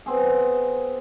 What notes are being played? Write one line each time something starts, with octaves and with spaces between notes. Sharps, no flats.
B3 C4 G#4